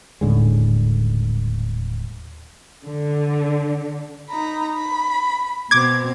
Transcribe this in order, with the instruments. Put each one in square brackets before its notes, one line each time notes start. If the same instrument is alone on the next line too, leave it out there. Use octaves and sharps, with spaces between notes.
[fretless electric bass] D#1 A2 D3 G#3
[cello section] D3
[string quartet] D#4 A#5 B5
B5
[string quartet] B2 C4 [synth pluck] D6 G#6